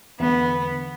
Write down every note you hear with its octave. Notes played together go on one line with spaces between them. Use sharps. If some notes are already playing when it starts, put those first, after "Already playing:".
E2 D3 B3